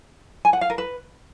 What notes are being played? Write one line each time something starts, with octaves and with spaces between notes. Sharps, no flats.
G#5
F#5
F5
A#4
B4